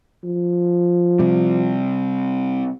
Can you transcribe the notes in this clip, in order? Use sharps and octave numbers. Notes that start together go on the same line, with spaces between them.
F3
C3 G3